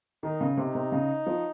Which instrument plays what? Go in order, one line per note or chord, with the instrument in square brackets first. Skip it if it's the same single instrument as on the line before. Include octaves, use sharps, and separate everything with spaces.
[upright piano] D#3 [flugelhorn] D#4
[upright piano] C#3
[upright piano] C3 [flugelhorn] D#4
[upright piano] C3
C#3
F3